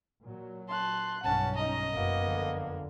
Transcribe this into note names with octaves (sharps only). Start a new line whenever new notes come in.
A#2 F#3
A5 C6 F#6
B1 G2 C#4 F#5 A5
D#4 D#5 A#5
F#1 A#3 B3
F2 D3